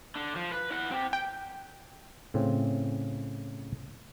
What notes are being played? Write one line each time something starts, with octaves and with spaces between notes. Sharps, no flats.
D3
F3
B4
E4 F#5
C4 G4
G5
A2 C#3 C4